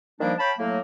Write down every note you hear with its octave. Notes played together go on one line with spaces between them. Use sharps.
D#3 F3 G3 A#3 D4
C#5 F5 G5 A5 B5
A2 F#3 A3 A#3